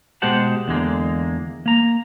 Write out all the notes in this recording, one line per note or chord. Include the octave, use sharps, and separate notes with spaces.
B2 G#3 G4 C5 F#5 A5
E2 D3 G#3 A#3
A#3 A#5